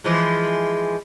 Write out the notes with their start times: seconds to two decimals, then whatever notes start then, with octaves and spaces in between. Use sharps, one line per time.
0.04 E3 F3 G#3